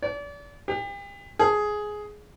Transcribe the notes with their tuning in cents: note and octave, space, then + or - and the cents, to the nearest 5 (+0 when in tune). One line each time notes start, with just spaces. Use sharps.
D5 -35
G4 +40
G#4 +10